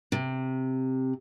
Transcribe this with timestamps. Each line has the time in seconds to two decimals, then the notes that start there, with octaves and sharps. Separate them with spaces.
0.12 C3